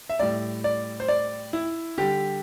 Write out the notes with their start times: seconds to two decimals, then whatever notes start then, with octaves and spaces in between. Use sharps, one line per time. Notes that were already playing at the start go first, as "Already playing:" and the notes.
0.09 E5
0.19 A2 G3 D5
0.64 D5
1.00 C5
1.08 D5
1.53 E4
1.98 D3 G3 G4